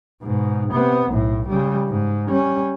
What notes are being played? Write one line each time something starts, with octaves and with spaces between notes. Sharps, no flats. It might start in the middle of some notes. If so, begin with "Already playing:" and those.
G#2 B2
C3 B3
B1 A2
C#3 G3
G#2
G3 C#4